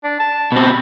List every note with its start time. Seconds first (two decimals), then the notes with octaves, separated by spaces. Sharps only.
0.04 D4
0.19 A5
0.52 B2 C4
0.66 B5